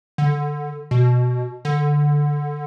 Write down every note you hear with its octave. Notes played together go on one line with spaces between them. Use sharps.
D3
B2
D3